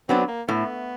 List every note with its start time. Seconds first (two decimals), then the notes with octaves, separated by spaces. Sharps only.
0.09 F#3 B3 C4 D4
0.28 A#3
0.48 A2 B3